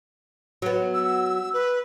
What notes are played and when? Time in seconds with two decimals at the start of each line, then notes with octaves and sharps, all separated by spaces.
0.62 F#3 B3
0.94 E6
1.54 B4